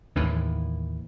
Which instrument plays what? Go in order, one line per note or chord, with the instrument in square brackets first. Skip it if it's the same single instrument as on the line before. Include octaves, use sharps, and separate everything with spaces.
[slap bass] D#2 A2 E3